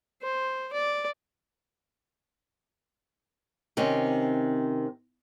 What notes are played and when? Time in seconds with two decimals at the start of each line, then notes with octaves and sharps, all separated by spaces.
0.22 C5
0.73 D5
3.77 C3 D#3 C4 C#4